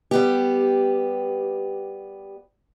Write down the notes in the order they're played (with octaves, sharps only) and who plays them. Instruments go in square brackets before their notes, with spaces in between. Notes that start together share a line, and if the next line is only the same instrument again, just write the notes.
[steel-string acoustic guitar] G3 B3 G4